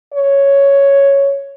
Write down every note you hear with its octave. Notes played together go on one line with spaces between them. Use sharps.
C#5